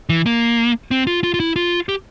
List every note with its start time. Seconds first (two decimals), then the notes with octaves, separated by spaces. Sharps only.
0.09 E3
0.26 A#3
0.91 C4
1.07 F4
1.24 F4
1.34 F4
1.40 E4
1.56 F4
1.89 G4